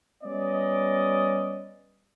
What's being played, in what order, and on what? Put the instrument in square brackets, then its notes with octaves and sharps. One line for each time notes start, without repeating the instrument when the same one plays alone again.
[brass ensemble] G3 B3 C#4 D5 D#5